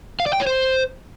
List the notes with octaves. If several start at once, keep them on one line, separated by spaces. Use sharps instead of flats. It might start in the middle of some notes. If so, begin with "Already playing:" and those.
F5
D5
G5
C#5
C5